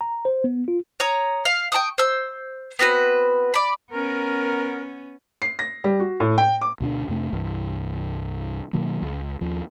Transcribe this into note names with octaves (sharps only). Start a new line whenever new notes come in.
A#5
C5
B3
F4
C#5 A#5 D#6
F5
G5 A5 C#6 D#6
C5 E6
B3 C4 F#4 B4
D5 B5
B3 C#4 A#4
C7
A#6
G3
F#4
A2
G5
D6
D2 B2 C4 D4
F2 C3 A3 D4
C2 G2 E3
B2 D#3 F#3 A#3
C#2
D#2 F3